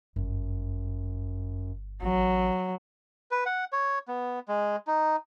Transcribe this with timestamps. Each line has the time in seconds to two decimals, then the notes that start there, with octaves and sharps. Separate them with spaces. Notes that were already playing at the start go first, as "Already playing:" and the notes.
0.16 G1 F#2
2.02 A1 F#3
3.31 B4
3.46 F#5
3.73 C#5
4.08 B3
4.48 G#3
4.87 D#4